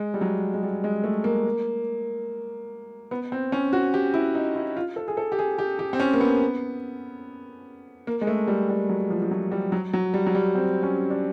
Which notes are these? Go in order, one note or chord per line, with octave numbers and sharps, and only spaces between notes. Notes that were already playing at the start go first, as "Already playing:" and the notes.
Already playing: G#3
G3
F#3
G#3
G3
G#3
A3
A#3
B3
C4
C#4
F#4
G4
E4
D#4
E4
F4
A4
G#4
A4
G4
G#4
G4
G4
C4
C#4
A#3
B3
A#3
G#3
A3
G3
G3
F#3
F3
F3
F#3
G3
F#3
F#3
G3
F#3
G3
C4
C#4
D4